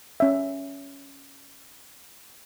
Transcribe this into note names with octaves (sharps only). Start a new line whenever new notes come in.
C#4 E5